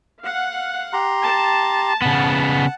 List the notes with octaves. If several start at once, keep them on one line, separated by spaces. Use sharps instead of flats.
F5 F#5
G4 A#5 C6
A5
C#3 B3 F#5